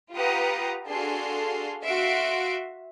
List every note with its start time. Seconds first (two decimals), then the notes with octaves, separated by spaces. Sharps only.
0.13 F4 G4 B4 F#5 A#5 D#6
0.89 D4 F#4 G#4 A4 F5 C6
1.84 F#4 E5 F5 C6 D7